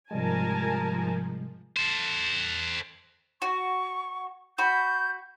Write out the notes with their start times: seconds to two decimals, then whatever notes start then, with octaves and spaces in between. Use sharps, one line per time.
0.11 G#2 C3 F3 G3 G#3 A#4 G#5 A5
1.77 A4 C5
3.42 F#4 C#6
4.58 F#4 B5 G6